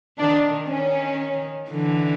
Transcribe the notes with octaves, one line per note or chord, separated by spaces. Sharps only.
D#3 D4
D#3 C#4
D3 E3